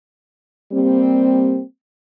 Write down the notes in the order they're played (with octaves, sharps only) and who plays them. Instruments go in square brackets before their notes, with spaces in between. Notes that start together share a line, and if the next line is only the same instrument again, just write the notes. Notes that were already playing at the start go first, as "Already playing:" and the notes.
[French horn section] G3 A#3 C4